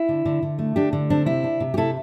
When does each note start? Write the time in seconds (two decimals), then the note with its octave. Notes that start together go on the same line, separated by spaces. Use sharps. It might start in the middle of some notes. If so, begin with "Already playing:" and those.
Already playing: E4
0.09 D3
0.25 D3
0.43 D3
0.59 A3
0.76 D3 D4 G4
0.93 D3
1.10 C4 D4
1.26 C3 E4
1.44 D4
1.60 C3
1.74 G4
1.77 C3 E4 A4